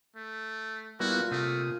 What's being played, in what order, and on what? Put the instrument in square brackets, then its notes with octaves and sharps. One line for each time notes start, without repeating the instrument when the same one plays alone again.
[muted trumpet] A3
[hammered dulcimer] A#2 [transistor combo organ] G3 B3 E4 [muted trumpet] F#4
[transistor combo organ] C3 D#6 [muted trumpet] A3 [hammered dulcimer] F5